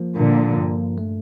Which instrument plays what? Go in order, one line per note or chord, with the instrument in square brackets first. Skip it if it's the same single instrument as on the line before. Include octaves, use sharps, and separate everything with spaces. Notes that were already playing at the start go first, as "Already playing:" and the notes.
Already playing: [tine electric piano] F3 A#3
[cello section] A#2 D3 [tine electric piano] A#3
[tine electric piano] G2
A3